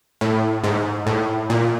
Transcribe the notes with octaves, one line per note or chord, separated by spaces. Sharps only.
A2
G#2
A2
A#2